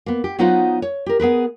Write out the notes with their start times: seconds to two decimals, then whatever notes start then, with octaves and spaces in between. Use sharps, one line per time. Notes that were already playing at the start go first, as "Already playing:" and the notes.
0.06 A#3 B3
0.24 G4
0.39 F#3 B3 D#4 F4 C5 F#5
0.82 C#5
1.06 G4 A#4
1.20 B3 G#4 A#4 B4